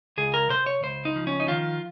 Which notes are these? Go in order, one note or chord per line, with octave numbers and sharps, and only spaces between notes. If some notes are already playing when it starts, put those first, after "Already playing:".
C#2 G#4
A#4
C3 C5
C#5
C#2 C5
D#4
F3
C#4
D#4
D#3 F4